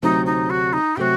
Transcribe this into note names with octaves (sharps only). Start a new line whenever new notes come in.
D2 C3 F#3 A3 C4 D#4
D#4
F#4
D#4
C3 F#3 A3 C4 F#4 G4